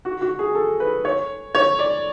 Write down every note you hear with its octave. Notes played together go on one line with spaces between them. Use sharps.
F#4
F#4
G#4
A4
B4
C#5
C#5
D5